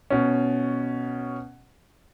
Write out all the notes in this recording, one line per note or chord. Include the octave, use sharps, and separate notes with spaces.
B2 C#4